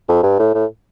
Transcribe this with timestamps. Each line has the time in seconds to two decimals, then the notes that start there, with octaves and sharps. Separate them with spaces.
0.08 F2
0.23 G2
0.39 A2
0.54 A2